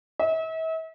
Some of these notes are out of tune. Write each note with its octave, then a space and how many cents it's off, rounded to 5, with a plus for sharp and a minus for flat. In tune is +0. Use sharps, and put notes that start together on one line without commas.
E5 -40